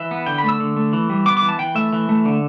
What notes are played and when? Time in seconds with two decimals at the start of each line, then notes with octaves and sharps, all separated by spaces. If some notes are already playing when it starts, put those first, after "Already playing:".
Already playing: E3 E5
0.11 B3
0.26 D3 G5
0.38 B5
0.43 A3
0.49 E6
0.60 D3
0.76 A3
0.93 E3
1.10 G3
1.26 B3 D6
1.37 D6
1.42 E3
1.49 A5
1.59 E3 G5
1.75 A3 E5
1.93 E3
2.09 A3
2.25 D3